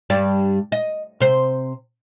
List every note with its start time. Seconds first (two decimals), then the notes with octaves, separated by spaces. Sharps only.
0.10 G2 D5
0.72 D#5
1.20 C3 C5